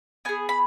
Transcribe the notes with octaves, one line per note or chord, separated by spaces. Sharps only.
B3 G#4 G#5
B5